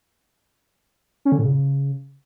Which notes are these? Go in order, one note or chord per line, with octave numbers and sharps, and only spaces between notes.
C#4
D3
A2
C#3